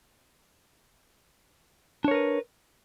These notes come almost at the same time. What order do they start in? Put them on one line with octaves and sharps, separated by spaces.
D4 C#5 A#4 B4